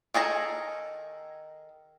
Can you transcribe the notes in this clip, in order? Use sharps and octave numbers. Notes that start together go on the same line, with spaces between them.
D#3 G#4 A4 A#5